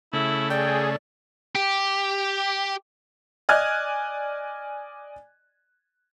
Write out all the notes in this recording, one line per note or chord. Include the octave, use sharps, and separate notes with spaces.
C#3 A3 E4
G#4 D5 G5
G4
D5 D#5 G#5 F6 F#6 G#6